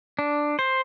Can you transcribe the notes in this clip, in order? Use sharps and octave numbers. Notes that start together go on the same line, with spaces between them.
D4
C5